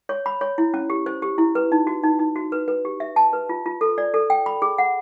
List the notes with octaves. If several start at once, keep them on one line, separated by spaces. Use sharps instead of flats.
C#5
B5
C#5
E4
C#4
G4
C5
G4
E4
B4
D#4
F#4
D#4
D#4
F#4
B4
B4
G4
E5
A5
B4
F4
F4
A4
D5
A4
G5
B5
G#4
F#5